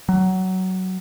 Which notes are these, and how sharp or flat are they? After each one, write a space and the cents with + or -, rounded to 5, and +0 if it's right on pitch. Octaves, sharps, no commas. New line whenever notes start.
F#3 +15